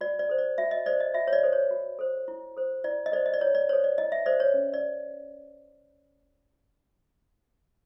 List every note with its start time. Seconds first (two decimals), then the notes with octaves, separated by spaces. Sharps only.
0.01 F#4 D5
0.19 D5
0.29 A4 C5
0.39 D5
0.58 F#4 E5
0.71 D#5
0.86 A4 C5 D5
1.01 D#5
1.14 F#4 E5
1.28 C#5
1.33 D5
1.43 A4 C5
1.53 C#5
1.71 F#4
1.99 A4 C5
2.28 E4
2.57 A4 C5
2.84 E4 D5
3.06 D#5
3.12 A4 C5 D5
3.26 D#5
3.34 D5
3.41 E4 C#5
3.55 D5
3.69 A4 C5 C#5
3.84 D5
3.98 E4 D#5
4.12 E5
4.26 A4 C5 D5
4.40 C#5
4.54 C#4
4.74 D5